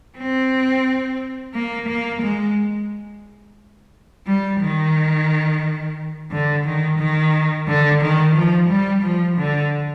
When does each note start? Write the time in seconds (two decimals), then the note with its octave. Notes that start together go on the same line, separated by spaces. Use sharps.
0.18 C4
1.54 A#3
1.88 A#3
2.22 G#3
4.27 G3
4.61 D#3
6.31 D3
6.65 D#3
6.99 D#3
7.67 D3
8.01 D#3
8.35 F3
8.69 G3
9.02 F3
9.37 D3